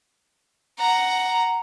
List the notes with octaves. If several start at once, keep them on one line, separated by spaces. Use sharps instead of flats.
F#5 A#5